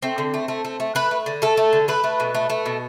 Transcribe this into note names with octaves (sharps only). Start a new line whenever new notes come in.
A3 C4
D3
A3
A3
A3
A3
A3 B4
A3
D3
A3 A4
A3
D3
A3 B4
A3
B2
A3
A3
B2